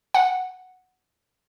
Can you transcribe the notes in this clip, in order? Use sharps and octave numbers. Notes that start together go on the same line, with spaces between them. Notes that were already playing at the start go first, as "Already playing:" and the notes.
F#5